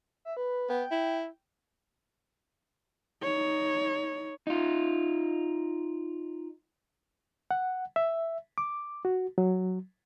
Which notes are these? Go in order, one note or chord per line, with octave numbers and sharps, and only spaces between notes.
E5
B4
B3 G5
E4
D#4 C#5
D#4 F4
F#5
E5
D6
F#4
F#3